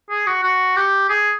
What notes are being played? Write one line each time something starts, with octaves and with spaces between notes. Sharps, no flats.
G#4
F#4
F#4
G4
G#4